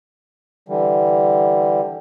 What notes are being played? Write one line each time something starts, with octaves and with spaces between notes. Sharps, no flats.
D3 E3 G3